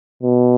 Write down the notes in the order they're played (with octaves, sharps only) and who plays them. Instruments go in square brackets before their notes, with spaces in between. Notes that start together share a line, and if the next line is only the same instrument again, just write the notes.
[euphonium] B2